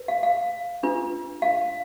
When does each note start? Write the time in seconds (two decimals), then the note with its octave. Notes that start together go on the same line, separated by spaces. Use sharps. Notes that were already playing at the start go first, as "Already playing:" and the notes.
Already playing: B4
0.08 F5
0.23 F5
0.83 D4 F4 B4
1.42 F5